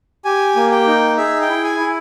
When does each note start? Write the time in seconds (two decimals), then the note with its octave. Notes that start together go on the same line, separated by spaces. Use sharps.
0.25 G4 G#5
0.56 A#3
0.71 G5
0.87 D#4
1.17 G#4 E5
1.41 G5
1.49 E4
1.64 G#5
1.80 E4